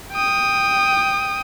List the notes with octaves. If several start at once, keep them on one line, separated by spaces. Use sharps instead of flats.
G5 D#6